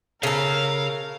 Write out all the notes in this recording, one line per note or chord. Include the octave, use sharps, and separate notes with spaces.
C#3 A4 A#4 F5